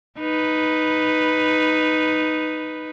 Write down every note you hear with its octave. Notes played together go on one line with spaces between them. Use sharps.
D#4 B4